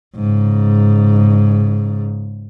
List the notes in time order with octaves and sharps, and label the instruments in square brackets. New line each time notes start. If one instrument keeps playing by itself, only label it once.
[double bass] G#2 C#3